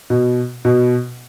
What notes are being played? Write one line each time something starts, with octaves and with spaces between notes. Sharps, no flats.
B2
B2